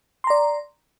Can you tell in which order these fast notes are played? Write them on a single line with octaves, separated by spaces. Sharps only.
C6 A#5 D5